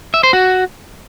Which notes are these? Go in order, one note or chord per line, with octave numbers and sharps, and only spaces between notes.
E5
C5
F#4